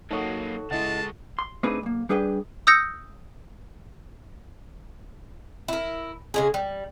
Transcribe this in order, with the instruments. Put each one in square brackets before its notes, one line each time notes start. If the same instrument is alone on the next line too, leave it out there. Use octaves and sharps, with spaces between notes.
[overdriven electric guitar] F#3 A#3 [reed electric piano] D#4 C#5 D#6 [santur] F#4 A4
[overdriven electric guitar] C#3 G#3 [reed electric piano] E4 D#5 F#5 [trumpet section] F4 A5
[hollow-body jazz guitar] C6
A3 C4 D4 D#4 G#4 B4
B1 A#3
G3 D4 G#4 B4 F5 G5
[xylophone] D#6 E6 G6 A#6 C#7
[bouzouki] E4 A#4
C#3 G#3 G#4
G3